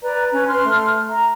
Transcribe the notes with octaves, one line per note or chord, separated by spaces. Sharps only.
B4 D5 A#5
C#4 G#5
C6 F6
A3
A#5